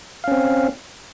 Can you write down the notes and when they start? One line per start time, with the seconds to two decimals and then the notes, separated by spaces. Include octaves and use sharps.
0.24 F5
0.28 C#4
0.31 C4